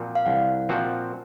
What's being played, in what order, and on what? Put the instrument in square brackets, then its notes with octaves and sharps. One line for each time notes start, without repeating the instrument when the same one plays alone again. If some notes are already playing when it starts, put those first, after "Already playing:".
Already playing: [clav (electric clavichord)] A#2 F3 C4 F#4
[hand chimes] F5
[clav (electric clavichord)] C2 [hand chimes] F#5
[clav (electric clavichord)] A#2 F3 C4 F#4